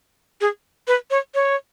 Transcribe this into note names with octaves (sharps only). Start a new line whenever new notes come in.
G#4
B4
C#5
C#5